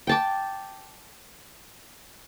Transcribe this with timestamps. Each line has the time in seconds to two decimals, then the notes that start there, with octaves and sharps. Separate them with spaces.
0.07 G5 A5 D6